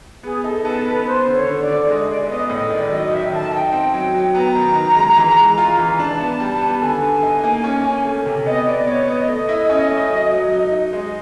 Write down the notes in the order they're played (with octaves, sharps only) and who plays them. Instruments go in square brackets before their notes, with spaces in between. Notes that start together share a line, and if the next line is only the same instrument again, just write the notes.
[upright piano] B3 [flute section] G#4
[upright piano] D#4 [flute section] A4
[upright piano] B3 [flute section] A4
[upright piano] B3 [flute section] B4
[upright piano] B3 [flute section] C5
[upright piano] D3
[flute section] C#5
[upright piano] D3
[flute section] D5
[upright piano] D3
[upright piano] G#3 [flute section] D#5
[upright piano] G#3 [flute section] D5
[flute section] E5
[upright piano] B3 [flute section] D#5
[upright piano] A2 [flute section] D#5
[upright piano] D#3 [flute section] D5
[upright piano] F#3 [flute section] D#5
[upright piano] D#3 [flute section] E5
[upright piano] D#3 [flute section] A5
[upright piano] D#4 [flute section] G5
[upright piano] C4
F#3
F#3
[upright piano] B3 [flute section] A#5
[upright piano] D#3
D#3
G#3
E3
G#3
F4
E3
[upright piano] D4 [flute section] A5
[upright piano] B3
G3
B3
[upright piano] D3 [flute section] G#5
[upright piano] D3
D#4
A#3
C#4
C#4
A3
C3
[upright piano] B3 [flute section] D#5
[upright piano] B3 [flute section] D5
[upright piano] B3 [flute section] C#5
[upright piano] B3 [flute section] D#5
[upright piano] A3
E4
C#4
A3
F#3
F#3
D#4
D#4
[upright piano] G#3 [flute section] D#5